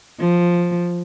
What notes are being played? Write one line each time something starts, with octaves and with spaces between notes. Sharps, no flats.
F3